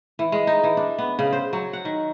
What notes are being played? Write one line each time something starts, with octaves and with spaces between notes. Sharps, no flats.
E3
G#3
D#4
E3
D4
B3
C#3
C5
F#3
F#5
D#3